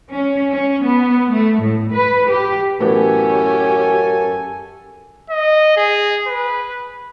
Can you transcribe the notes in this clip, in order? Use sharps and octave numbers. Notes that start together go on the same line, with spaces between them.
C#4
C#4
B3
A3
A2
B4
G4
F#2 A2 E3 B3 C#4 G4 A4 G#5
D#5
G#4
B4